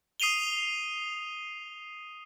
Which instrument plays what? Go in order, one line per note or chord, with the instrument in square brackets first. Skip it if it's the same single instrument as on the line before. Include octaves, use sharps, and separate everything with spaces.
[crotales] D#6 C7 D#7 F7 G7